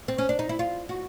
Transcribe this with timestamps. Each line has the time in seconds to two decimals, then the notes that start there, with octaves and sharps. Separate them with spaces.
0.08 C4
0.18 C#4
0.29 D4
0.39 D#4
0.49 E4
0.59 F4
0.89 F#4